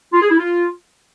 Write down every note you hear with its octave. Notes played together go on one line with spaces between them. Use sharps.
F4
G#4
E4
F4